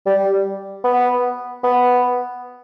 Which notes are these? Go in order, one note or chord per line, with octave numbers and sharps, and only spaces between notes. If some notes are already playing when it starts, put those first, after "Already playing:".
G3
B3
B3